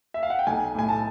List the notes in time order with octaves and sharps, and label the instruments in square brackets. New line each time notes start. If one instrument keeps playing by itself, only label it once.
[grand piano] E5
F5
F#5
G5
B1 G#5
A2 G#5
A5